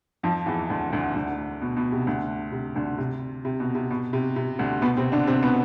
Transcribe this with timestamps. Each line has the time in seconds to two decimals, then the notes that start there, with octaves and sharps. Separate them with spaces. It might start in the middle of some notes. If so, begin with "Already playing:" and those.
0.23 F2 F3
0.46 E2 E3
0.69 D2 D3
0.93 D2 D3
1.15 D2 D3
1.61 B2
1.76 B2
1.92 C3
2.07 D2 D3
2.52 C3
2.75 D2 D3
2.98 C3
3.45 C3
3.60 B2
3.75 C3
3.90 B2
4.13 C3
4.36 C3
4.59 D2 D3
4.82 B2 B3
4.97 C3 C4
5.12 D3 D4
5.27 C3 C4
5.42 B2 B3